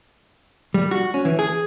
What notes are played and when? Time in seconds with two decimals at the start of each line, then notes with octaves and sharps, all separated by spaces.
0.74 G3
0.91 F#4
1.14 C#4
1.25 E3
1.39 G#4